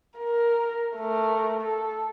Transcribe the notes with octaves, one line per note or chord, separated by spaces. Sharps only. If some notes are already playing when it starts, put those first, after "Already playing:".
A#4
A3 A#4
A4